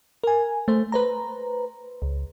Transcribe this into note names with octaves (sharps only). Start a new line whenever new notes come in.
A#4 G#5
A3 C5
B4 C5 A#5
C#2